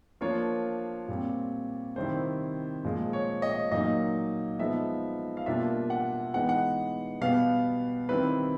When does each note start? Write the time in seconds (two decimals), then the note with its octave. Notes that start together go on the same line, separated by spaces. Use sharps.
0.21 F3 A#3 D4 F4 C#5
1.08 A#2 G3 C4
1.96 C3 D#3 G3 C4 E4 C5
2.85 A#2 F3 G#3
3.13 C#5
3.42 D#5
3.71 A#2 F#3 A#3 D#4 D#5
4.59 F3 G#3 B3 D#4 E5
5.37 F5
5.46 B2 G3 A#3 D4 F4 E5
5.90 F#5
6.34 E3 G#3 B3 D#4 F#5
6.49 F#5
7.21 B2 G3 B3 F5
8.09 D#3 G3 C4 E4 B4